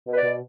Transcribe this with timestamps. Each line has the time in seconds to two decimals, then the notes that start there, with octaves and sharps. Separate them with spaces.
0.08 B2 B4
0.16 D5
0.24 B2